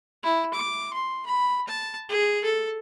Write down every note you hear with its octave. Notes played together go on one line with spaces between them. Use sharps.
E4
D6
C6
B5
A5
G#4
A4